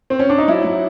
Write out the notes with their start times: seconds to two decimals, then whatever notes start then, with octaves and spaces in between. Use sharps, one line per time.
0.10 C4
0.19 C#4
0.30 D4
0.38 D#4
0.48 F#3 E4
0.64 F#3